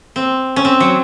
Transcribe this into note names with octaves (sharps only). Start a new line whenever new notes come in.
C4
C#4
C4
F#3